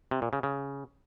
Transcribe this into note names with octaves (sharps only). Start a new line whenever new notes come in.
C3
A#2
C#3
C#3